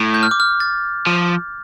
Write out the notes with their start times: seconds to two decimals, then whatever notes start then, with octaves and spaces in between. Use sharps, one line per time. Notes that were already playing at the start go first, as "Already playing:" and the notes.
Already playing: A2
0.14 G6
0.23 F6
0.31 D6
0.40 F6
0.60 A6
1.07 F3